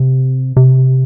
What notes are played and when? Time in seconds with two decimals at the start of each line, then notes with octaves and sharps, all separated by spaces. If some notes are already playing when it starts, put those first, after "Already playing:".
Already playing: C3
0.57 C3